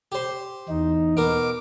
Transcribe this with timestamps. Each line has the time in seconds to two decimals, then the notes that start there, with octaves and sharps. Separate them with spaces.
0.12 G4 C5
0.69 E2 D#4
1.17 B2 A#4 D6